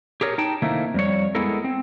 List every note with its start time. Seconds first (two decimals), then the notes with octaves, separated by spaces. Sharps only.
0.21 G4 G#4 A#4 C#5
0.38 D#4 G5 A5
0.62 C3 D#3 A3 A#3 D#4 E4
0.94 F2 G3 C#5
1.35 G#3 B3 E4 A4 A#4
1.64 C4